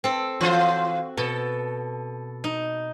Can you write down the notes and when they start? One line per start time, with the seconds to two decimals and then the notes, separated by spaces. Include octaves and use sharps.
0.04 C4 A4
0.41 E3 F4 F#4 C5
1.17 B2 A4
2.44 D#4